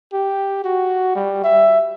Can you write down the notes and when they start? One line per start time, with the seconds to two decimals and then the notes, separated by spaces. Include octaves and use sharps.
0.13 G4
0.64 F#4
1.16 G3
1.44 E5